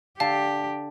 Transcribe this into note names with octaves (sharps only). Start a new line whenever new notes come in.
D3 G4 F5 A5